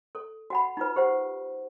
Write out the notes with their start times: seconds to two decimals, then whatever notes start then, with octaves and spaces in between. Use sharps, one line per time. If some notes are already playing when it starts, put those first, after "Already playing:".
0.15 A4
0.50 F#4 F#5 B5
0.77 D#4 F4 B4
0.96 G4 C5 F#5